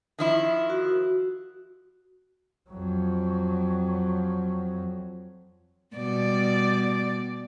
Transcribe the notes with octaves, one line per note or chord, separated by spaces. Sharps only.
D#3 F3 E4
F#4
F2 F#3
B2 G3 D5